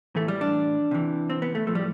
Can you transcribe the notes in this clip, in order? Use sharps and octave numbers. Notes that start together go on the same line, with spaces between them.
A2 E3 A3
G3
D4
C3 E3
C4
B3
A3
A2 F3 A3
G3